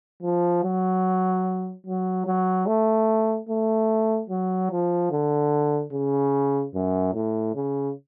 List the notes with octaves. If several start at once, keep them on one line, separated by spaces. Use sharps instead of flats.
F3
F#3
F#3
F#3
A3
A3
F#3
F3
D3
C#3
F#2
A2
C#3